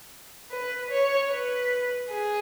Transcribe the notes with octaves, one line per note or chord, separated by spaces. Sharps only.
B4
C#5
B4
G#4